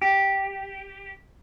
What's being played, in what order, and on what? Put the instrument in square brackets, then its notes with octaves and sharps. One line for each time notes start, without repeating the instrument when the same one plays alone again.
[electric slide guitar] G4